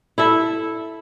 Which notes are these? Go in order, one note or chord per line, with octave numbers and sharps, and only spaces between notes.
E4 A4 E5